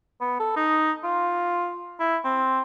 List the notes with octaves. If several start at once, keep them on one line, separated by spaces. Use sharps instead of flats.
B3
A4
D#4
F4
E4
C4